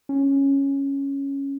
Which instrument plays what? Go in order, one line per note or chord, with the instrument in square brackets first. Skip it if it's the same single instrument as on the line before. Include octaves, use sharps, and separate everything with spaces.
[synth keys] C#4